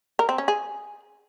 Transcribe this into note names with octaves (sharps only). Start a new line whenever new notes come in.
A#4
C4
C#4
G#4